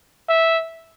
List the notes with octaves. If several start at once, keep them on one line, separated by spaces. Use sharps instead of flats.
E5